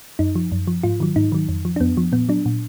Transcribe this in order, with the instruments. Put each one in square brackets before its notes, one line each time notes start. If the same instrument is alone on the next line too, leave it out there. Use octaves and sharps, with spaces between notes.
[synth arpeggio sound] F#2 D#4
F3
F#2
F3
G#2 F4
D#3 F#3
G#2 D#4
D#3 F#3
F2
F3
D4
F2 B3
F3
A#2 B3
F#3 D4
A#2